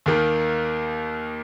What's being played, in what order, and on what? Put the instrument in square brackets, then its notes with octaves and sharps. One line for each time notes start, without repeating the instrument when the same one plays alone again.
[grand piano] D#2 D#3 A#3